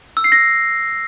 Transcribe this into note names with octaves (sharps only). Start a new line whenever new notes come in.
E6
C7
A#6